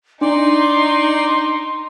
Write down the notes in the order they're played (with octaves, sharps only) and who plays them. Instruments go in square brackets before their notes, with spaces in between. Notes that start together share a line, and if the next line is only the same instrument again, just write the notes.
[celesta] D4 [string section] D#4 [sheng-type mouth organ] D5 [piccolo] C6